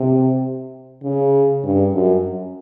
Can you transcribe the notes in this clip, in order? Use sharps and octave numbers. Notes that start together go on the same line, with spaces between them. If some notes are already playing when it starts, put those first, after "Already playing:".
Already playing: C3
C#3
G2
F#2